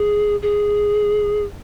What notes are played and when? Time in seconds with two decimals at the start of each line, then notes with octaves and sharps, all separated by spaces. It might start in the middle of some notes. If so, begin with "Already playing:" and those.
Already playing: G#4
0.43 G#4